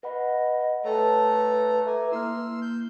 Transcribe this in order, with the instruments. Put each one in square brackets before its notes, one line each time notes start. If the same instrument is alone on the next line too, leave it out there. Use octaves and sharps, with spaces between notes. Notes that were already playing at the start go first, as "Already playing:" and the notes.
[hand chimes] B4 F#5 B5 [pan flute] D#5
[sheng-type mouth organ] A3 A4 A#5 [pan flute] B4 [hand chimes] C#5 G5 A5
[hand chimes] E5 A#5 D6 [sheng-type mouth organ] G#5
[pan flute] A#3 [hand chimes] E4 F6 [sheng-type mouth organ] C6 E6
[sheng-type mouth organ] G6